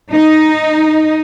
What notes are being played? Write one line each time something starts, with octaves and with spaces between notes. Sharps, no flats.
D#4